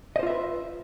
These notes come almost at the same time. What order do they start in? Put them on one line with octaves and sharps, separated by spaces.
D#5 C5 F4 E5 B4